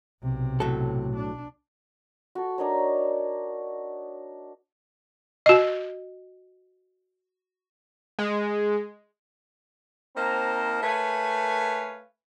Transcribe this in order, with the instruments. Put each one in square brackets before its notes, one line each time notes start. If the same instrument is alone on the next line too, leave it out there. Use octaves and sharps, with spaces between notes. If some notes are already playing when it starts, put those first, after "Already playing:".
[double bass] B1 C3
[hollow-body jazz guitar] A2 F#3 A4
[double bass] D4
[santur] F#4 A4
D4 D#4 A#4 C#5
[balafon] F#4 D#5
[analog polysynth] G#3
[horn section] A#3 C4 D#4 C5 A5 A#5
A3 A#4 B4 C#5 F5 G#5